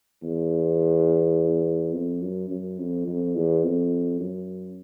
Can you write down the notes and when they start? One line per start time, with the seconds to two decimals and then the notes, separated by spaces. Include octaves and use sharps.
0.23 E2
1.93 F2
2.22 F#2
2.50 F#2
2.79 F2
3.08 F2
3.35 E2
3.64 F2
4.21 F#2